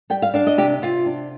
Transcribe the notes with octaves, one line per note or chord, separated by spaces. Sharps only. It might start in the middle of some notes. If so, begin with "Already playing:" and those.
G3 G5
F5
D4 F5
D#5
C3 G4
C3 F4
D4